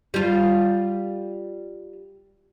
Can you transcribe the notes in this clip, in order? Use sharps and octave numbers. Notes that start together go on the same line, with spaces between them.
G3 F4